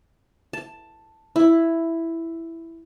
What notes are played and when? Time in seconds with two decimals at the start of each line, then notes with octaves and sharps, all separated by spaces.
0.53 A5
1.36 E4